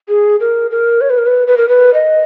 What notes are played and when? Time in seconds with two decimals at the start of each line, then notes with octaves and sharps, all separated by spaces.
0.09 G#4
0.40 A#4
0.71 A#4
1.01 C#5
1.10 B4
1.18 A#4
1.27 B4
1.47 B4
1.57 A#4
1.69 B4
1.94 D#5